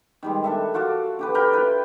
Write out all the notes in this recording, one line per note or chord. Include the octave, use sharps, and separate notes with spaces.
D#3 G3 G#3
D4 A4 E5
F4 F#4 A4 D5
D3 G4 B4
A#4 D5 G5 B5
E4 B4 D5